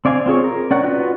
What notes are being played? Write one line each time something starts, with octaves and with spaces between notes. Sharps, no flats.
C4 D5 F5 G#5
C4 F4 G#4 C#5
A#4
C#4 D5 F#5 F#6
D#4 F4 F#4 B4